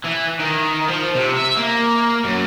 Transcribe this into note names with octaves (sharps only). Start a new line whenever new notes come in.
E3
D#3
F3
C3
E5
A#3
F#2